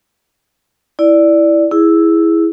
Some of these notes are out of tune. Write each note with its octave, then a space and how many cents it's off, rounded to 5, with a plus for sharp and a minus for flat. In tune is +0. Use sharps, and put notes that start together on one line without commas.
E4 +0 D5 +0
E4 -5 G#4 -5